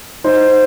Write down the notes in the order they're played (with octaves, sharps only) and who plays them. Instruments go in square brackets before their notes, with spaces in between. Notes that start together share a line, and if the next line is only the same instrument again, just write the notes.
[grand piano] D#4 C5